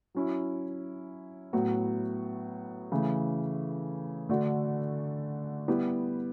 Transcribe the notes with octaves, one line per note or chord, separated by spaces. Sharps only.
F#3 C#4 E4
A2 F#3 B3 F#4
C#3 E3 A3
D3 A3 D4 F#4
G3 B3 E4 G4